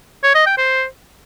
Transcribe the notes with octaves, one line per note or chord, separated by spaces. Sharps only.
C#5
D#5
G5
C5